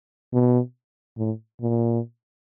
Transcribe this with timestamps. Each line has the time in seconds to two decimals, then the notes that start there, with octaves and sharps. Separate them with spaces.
0.34 B2
1.18 A2
1.61 A#2